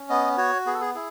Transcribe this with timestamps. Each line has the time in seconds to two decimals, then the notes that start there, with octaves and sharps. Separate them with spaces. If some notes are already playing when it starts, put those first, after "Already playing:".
Already playing: C#4
0.10 B3 D#5
0.37 F#4 C#5
0.66 B3 G#4
0.74 A4
0.81 G#4
0.95 E4 G#4